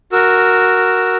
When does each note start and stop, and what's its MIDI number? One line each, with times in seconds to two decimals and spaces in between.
0.12 1.17 66
0.12 1.17 70
0.12 1.17 88